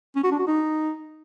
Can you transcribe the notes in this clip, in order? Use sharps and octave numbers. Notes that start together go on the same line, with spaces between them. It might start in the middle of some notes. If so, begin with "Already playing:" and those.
C#4
F#4
D4
F#4
D#4